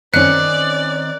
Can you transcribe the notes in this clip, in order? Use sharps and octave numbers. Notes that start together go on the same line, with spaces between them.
D#3 C4 C#4 D#4 D5 F#6 C#7